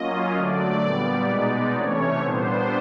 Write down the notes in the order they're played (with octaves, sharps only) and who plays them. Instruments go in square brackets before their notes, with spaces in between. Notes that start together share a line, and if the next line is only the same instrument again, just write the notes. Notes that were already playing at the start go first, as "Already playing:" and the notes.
Already playing: [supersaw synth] F#3 A#3 C#4 F4 D#5
D3 F#3 A3 D5
A#2 G3 B3
B2 G#3 B3 D#4
C3 E3 A3 C#4 C#5
A#2 G3 B3 D4 C5